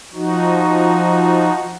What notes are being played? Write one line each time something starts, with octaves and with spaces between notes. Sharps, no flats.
F3 D#4 F#4